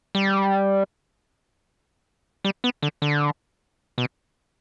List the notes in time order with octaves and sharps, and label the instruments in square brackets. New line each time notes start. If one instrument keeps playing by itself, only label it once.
[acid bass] G3
G3
B3
D3
D3
B2